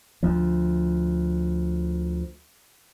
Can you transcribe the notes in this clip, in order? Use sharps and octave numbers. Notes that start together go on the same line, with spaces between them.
D2 F3